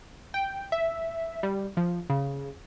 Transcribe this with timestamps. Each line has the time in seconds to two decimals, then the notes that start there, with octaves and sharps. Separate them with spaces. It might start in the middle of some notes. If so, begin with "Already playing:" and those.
0.34 G5
0.72 E5
1.43 G3
1.77 F3
2.10 C#3